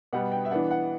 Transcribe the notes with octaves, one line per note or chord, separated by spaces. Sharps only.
B2 G3 B3 F#5
G5
E5
E3 B3 D4 F#5
F#5